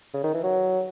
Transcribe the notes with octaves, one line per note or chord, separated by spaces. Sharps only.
C#3
D#3
E3
F#3